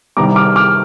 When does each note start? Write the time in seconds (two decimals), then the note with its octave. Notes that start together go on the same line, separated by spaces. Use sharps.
0.17 C2 C3 D#3 G3 A#5 D6
0.36 D6 F6
0.56 D6 F6